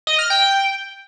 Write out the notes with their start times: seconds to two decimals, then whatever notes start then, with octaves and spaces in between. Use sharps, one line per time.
0.07 D#5
0.19 F6
0.30 G5